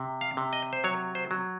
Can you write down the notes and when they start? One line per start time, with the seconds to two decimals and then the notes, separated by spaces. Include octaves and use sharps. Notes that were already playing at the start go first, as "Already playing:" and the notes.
Already playing: C3
0.21 F5
0.37 C3
0.53 D#5
0.73 C5
0.84 F#3 C#5
1.15 C5
1.31 F#3